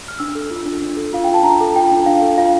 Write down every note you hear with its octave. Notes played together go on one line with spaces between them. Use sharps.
F6
D4 E6
A4
F4
D4
D4
A4
F4 F5
D4 G5
A5
D4 A#5
A4
F4 G5
D4
D4 F5
A4
F4 F5